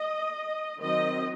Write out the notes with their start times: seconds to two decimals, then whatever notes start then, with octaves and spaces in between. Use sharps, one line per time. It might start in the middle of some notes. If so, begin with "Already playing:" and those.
Already playing: D#5
0.79 D#3 F#3 C4 D#5